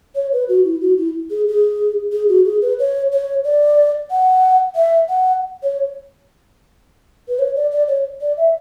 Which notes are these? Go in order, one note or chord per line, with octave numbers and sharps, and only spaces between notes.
C#5
B4
F#4
E4
F#4
E4
G#4
G#4
G#4
F#4
G#4
B4
C#5
C#5
D5
F#5
E5
F#5
C#5
B4
C#5
D5
D5
C#5
D5
E5